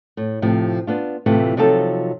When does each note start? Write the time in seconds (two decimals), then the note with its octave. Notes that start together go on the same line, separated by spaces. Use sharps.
0.17 A2
0.42 A2 C3 F3
0.87 B3 D4 F4
1.26 A2 C3 E3 A3 F4
1.57 C3 F3 F#3 D#4 F4 A4